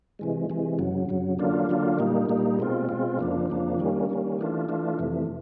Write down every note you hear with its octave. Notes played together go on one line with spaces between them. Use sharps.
C3 E3 G#3
C3 E3 G#3
F#2 C#3 F#3
F#2 C#3 F#3
D3 F#3 A#3 D4 F4
D3 F#3 A#3 D4 F4
A#2 G3 A#3 D#4
A#2 G3 A#3 D#4
B2 G#3 C4 F4
B2 G#3 C4 F4
F2 C#3 F3 A#3 D4
F2 C#3 F3 A#3 D4
D#3 G3 A#3 C#4
D#3 G3 A#3 C#4
E3 A3 D4 F4
E3 A3 D4 F4
F2 C3 E3 A3